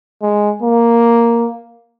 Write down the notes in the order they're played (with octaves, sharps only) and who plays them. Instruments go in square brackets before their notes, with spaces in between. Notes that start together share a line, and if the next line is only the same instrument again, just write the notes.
[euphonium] G#3
A#3